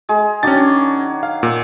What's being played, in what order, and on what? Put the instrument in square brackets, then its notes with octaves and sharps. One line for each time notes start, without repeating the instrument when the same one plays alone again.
[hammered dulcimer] G#3 G#4
[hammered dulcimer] D#3 F#3 D4 [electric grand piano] C#4 A6
[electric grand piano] F5
A#2